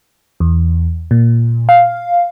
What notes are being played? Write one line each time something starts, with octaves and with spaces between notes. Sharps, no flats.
E2
A#2
F5